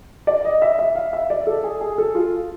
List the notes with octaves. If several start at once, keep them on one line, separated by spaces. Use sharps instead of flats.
D5
D#5
E5
E5
F5
E5
D5
A4
G#4
G#4
A4
F4